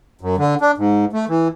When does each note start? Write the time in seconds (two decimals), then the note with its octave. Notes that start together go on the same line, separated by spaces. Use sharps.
0.21 F#2
0.38 D3
0.61 D4
0.78 G#2
1.13 A3
1.28 E3